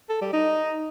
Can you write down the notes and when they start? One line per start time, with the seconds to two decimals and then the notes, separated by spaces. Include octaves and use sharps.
0.09 A4
0.21 G3
0.33 D#4